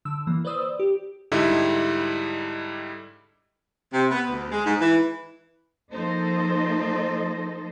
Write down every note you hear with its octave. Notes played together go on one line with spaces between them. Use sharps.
D3 E6
E3 A#3
B4 C5 D5 D#6 E6
G4
G#2 D3 G3 D#4 E4
C3
B3
D2
G#3
G#2
E3
F3 A#3 D#4 A4 C5 D#5